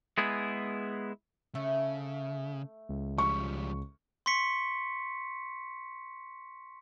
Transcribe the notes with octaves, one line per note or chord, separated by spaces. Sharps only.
G#3 B3 E4 G#4
C#3 A3
C#2
F3 G3 C#6
C6 C#6 B6 C#7